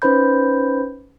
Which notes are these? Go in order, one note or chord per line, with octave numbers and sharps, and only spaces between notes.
C#4 D#4 B4 C5 B5 G6